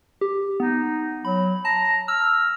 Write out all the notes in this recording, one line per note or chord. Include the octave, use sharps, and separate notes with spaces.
G4
B3 D#4
F#3 B5
A5 A#5
E6 F6